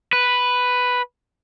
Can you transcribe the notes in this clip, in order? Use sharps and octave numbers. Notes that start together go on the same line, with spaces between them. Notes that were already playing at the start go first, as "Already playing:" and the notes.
B4